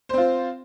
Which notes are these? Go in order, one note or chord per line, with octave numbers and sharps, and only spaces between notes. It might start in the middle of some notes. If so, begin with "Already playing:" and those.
C4 F4 C5